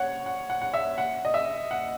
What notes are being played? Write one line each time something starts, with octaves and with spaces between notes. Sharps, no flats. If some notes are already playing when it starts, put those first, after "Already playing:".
Already playing: C#5 F#5
F#5
F#5
F#5
E5
F#5
D#5
E5
F#5